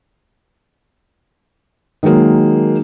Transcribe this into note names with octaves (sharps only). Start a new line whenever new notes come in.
D#3 F#3 G#3 A#3